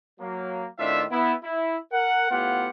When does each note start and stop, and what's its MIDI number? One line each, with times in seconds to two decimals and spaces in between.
0.20 0.67 54
0.20 0.67 58
0.79 1.05 45
0.79 1.05 51
0.79 1.05 60
0.79 1.05 62
0.79 1.05 65
0.79 1.05 76
1.11 1.34 59
1.11 1.34 64
1.44 1.77 64
1.93 2.29 70
1.93 2.29 78
2.31 2.70 45
2.31 2.70 59
2.31 2.70 65
2.31 2.70 67
2.31 2.70 78